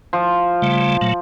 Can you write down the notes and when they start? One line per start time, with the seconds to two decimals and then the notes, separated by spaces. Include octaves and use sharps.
0.13 F3
0.62 C#3 G3 A3
1.01 A#2 F#3 A3